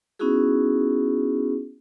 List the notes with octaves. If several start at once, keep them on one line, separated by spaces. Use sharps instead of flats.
B3 C#4 D#4 E4 F#4 G#4